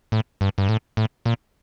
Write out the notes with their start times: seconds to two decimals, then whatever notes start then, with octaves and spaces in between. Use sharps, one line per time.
0.12 A2
0.41 G2
0.58 G2
0.69 A2
0.97 A2
1.25 A#2